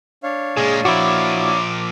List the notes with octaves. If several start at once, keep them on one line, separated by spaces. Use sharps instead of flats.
D4 C#5 F5
A#2 G#3 G#4
A#2 F3 E4 F#4 D6